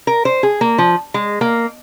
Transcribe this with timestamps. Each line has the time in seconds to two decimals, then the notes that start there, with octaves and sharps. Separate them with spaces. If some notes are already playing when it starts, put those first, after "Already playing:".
0.07 A#4
0.25 C5
0.43 G#4
0.61 A#3
0.78 F3
1.14 G#3
1.41 A#3